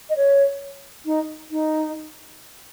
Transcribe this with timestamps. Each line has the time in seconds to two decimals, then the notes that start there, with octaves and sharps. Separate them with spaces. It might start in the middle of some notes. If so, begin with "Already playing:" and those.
0.09 D#5
0.15 C#5
1.05 D#4
1.50 D#4